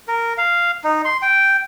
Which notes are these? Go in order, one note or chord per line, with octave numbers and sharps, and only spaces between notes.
A#4
F5
D#4
C6
G5